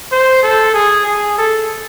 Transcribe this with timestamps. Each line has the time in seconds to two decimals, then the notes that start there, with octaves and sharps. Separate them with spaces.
0.12 C5
0.43 A4
0.74 G#4
1.06 G#4
1.38 A4